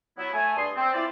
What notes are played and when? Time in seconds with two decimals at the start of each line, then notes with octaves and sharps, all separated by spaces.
0.18 F#3 B3 E4
0.33 A3 G#5
0.57 G2 G#4 C6
0.76 C4
0.93 C4 E4 F4 C5 D5